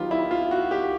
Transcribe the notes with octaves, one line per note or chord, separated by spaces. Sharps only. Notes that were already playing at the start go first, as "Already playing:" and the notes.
Already playing: D#3 F#3 B3 F4 G4
E4
F4
F#4
G4